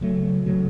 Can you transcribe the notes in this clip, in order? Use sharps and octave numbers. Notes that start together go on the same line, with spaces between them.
C#3 F#3 A3
C#3 F#3 A3